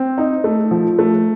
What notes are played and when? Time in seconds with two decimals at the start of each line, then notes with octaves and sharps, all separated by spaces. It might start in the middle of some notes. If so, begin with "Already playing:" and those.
Already playing: C4
0.18 D#4
0.44 A3
0.71 F3
0.99 A3